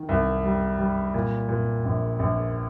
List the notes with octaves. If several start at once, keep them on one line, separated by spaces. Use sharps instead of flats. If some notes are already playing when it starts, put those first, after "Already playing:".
Already playing: D#3
C2
G3
G3
A#2
A#2
A#1
A#1